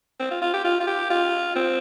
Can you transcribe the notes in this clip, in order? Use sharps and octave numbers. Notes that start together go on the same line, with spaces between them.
C4
F4
F4
G4
F4
F4
G4
F4
C4